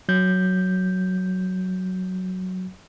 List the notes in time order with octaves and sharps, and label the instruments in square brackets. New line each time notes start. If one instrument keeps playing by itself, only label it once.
[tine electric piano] F#3 G6